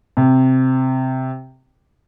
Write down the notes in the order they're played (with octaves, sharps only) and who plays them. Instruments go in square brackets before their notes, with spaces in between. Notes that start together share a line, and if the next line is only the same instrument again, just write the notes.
[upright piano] C3